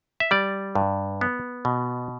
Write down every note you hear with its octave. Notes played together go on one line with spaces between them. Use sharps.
E5
G3 D5
G2
B3
B2